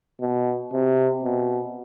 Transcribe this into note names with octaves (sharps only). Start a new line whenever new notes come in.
B2
C3
B2